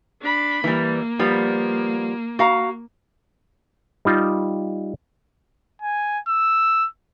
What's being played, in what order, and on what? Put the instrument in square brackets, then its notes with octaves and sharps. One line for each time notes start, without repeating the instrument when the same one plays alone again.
[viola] D4 B5
[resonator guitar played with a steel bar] E3 G3 [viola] A#3
[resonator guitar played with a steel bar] F3 G3 B3
F#4 F5 A#5
[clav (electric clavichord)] G3 D#4 F4
[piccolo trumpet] G#5
E6